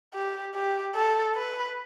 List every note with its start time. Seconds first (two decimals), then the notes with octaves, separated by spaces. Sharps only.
0.14 G4
0.55 G4
0.95 A4
1.36 B4